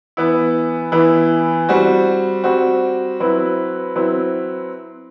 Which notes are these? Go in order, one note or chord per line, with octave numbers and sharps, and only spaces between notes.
E3 B3 E4
E3 B3 E4
G3 C4 F#4
G3 C4 F#4
F#3 C4 E4 B4
F#3 C4 E4 B4